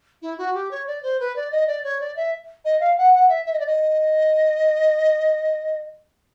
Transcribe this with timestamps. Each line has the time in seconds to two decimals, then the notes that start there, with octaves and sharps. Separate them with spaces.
0.22 E4
0.38 F#4
0.54 G4
0.71 C#5
0.87 D5
1.03 C5
1.20 B4
1.36 D5
1.52 D#5
1.67 D5
1.84 C#5
2.00 D5
2.16 E5
2.65 D#5
2.80 F5
2.98 F#5
3.14 F#5
3.29 E5
3.45 E5
3.53 D#5
3.59 D5
3.67 D#5